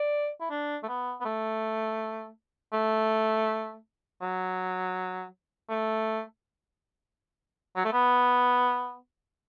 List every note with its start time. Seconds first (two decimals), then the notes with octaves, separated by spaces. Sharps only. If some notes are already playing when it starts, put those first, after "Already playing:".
Already playing: D5
0.41 E4
0.50 D4
0.83 A3
0.88 B3
1.21 B3
1.25 A3
2.73 A3
4.22 F#3
5.70 A3
7.76 F#3
7.85 A3
7.93 B3